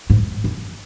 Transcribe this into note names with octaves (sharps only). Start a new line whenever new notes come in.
G#2
F2